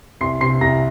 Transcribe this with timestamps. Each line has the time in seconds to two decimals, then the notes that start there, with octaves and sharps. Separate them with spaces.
0.21 C2 C6 C7
0.41 C3 C6 C7
0.61 C2 A#5 A#6